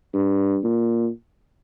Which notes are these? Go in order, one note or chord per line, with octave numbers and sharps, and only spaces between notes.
G2
A#2